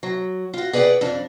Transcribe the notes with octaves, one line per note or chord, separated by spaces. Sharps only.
F#3
F4 F#4
G#4 B4 D5 D#5 F#5 G5
F2 D4